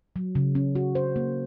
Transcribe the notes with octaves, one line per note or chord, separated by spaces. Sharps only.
F#3
C#3
C#4
F#4
C5
A#3